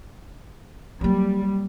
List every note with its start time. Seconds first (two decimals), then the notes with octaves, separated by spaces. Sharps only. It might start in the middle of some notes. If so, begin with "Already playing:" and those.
1.01 F#3 G3 A#3